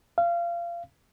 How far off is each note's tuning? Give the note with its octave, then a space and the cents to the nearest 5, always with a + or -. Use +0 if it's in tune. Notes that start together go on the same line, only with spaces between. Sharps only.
F5 -25